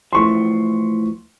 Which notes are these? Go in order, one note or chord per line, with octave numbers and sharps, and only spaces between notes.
A2 E3 F3 C6 C#6